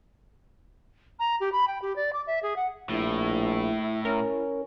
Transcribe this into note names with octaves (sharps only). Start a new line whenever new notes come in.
A#5
G4
B5
G5
G4
D5
D6
E5
G#4
F#5
A#1 A2 E4
C#4 A#4